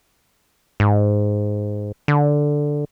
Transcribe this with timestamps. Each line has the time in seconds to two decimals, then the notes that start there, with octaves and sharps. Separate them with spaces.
0.80 G#2
2.08 D3